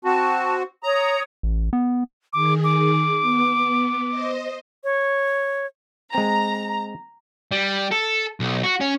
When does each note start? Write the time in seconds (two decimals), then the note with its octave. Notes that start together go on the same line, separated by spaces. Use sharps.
0.05 C4 F#4 A5
0.83 C#5 A#5 D#6
1.43 A1
1.73 B3
2.33 D#3 G#4 D6
2.64 D6
3.21 B3
4.08 C5 D#5
4.84 C#5
6.15 G#3 C4 A#5
7.52 G3
7.91 A4
8.40 B1
8.63 F#4
8.80 C#4